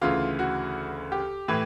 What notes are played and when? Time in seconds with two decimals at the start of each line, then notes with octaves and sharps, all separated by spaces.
0.01 D2 C#3 E3 F4
0.39 F#4
1.12 G4
1.48 A2 E3